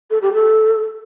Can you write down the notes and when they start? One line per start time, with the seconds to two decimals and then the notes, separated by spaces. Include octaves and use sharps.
0.10 A4
0.22 G4
0.33 A4